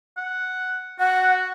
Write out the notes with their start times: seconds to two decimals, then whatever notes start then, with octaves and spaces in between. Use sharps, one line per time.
0.17 F#5
0.99 F#4 F#5